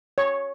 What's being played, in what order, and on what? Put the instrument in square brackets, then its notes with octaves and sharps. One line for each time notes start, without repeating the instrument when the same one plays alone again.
[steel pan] C#5